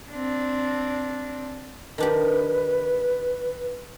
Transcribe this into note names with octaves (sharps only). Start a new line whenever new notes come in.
C4 D4
D#3 D4 G4 B4